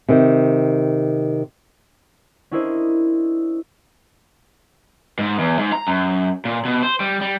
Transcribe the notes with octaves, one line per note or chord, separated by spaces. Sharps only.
C3 D#3
C#4 D4 E4 A#4 C5 D#5
G#2
E2
G#2
A#5
F#2
A#2
B2
C5
G3
G3